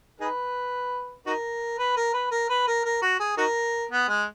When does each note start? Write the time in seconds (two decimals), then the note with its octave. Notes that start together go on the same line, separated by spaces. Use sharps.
0.20 D#4 G#4 B4
1.26 D#4 F#4 A#4
1.79 B4
1.97 A#4
2.14 B4
2.31 A#4
2.49 B4
2.67 A#4
2.85 A#4
3.02 F#4
3.20 G#4
3.37 D#4 F#4 A#4
3.91 B3
4.09 G#3